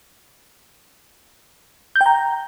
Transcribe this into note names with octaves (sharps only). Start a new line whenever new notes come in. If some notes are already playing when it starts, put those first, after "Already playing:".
G6
G5
A#5